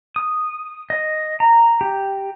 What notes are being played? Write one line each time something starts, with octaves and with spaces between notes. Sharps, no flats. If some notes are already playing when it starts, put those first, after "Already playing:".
D#6
D#5
A#5
G4